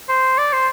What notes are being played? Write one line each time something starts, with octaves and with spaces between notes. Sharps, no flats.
C5
D5
C5